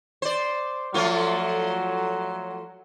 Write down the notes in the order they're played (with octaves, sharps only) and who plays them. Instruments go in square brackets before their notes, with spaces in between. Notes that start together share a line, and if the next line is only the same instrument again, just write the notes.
[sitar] C5 D5
[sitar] F3 A3 F4 [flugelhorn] F#3